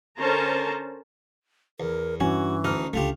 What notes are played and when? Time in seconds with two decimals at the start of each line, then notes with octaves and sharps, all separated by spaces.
0.17 D3 C#4 A#4 C5 A5 A#5
1.80 E2 A#4
2.20 G2 E3 C#4 F#4
2.64 D2 D#4 D#5 F6
2.93 C#2 D3 A3 F4 G4